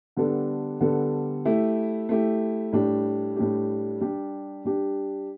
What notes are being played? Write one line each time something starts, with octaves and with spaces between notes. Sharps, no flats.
D3 G3 B3 D4 A4
D3 G3 B3 D4 A4
A3 E4 G4
A3 E4 G4
A2 G3 D4 G4
A2 G3 D4 G4
G3 D4 G4
G3 D4 G4